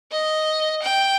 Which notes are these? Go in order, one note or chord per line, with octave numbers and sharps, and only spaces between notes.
D#5
G5